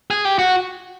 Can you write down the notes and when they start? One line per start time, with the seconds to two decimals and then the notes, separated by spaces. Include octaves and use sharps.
0.10 G#4
0.25 G4
0.39 F#4